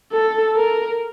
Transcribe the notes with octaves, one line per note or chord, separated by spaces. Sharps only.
A4
A#4